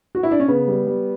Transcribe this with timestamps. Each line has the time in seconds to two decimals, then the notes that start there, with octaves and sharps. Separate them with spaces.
0.15 F#4
0.23 E4
0.31 D4
0.40 C#4
0.48 C#3 B3
0.68 G3
0.87 G3